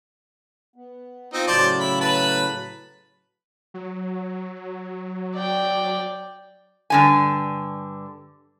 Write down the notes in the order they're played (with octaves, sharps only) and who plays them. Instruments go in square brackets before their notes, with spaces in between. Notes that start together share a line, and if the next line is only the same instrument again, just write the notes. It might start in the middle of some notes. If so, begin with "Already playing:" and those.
[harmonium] B3
[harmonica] C4 D#4 [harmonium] F4
[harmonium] A2 C#3 F#3 [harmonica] C5 D5 A5
[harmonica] E4 B5
B4 A5 B5
[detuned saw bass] F#3
[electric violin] D5 G5
[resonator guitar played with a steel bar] G2 D3 G#5